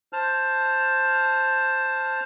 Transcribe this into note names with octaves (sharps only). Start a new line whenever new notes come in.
C5 A5 F6